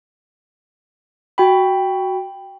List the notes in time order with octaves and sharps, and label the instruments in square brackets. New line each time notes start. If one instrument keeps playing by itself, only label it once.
[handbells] F#4 G5 B5